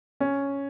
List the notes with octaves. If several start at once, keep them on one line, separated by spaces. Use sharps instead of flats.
C#4